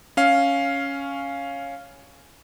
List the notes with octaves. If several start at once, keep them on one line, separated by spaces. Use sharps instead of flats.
C#4 F5